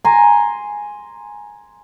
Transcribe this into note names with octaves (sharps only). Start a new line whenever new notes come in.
G#5 A#5 C6